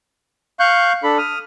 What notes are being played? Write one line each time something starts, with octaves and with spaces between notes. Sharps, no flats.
F5 C#6 F#6 G6
D4 A4 B5
D#6 F6